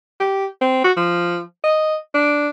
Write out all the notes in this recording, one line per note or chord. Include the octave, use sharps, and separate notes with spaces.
G4
C4
F#4
F3
D#5
D4